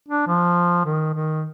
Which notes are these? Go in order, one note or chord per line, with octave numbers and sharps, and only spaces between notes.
D4
F3
D#3
D#3